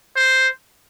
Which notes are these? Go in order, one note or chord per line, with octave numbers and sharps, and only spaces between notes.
C5